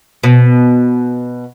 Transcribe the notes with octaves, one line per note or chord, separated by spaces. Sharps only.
B2